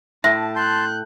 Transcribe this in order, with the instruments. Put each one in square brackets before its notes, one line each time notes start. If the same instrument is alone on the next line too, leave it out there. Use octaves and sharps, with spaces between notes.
[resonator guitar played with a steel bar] A2 [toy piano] E5 [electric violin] A5
[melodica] A5 C6 [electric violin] F#6 G6